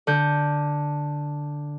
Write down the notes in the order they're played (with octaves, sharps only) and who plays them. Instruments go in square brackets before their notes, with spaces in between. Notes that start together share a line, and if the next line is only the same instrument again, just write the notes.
[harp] D3 G6